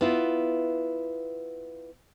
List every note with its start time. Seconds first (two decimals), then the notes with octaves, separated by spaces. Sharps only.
0.01 B3 E4 F4